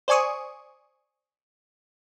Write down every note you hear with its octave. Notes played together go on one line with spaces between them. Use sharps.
C5 D5 G#5 C#6 D#6